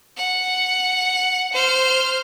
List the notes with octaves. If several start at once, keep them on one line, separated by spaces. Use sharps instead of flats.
F#5
C5 F6